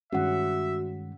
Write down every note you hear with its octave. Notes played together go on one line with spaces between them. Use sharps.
G2 D#3 G#3 C#4 F#4 E5 F#5